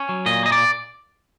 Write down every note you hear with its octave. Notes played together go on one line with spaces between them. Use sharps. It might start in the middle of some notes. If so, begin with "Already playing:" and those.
Already playing: C#4
F#3
A#2 D#5
A#3 D#5
D5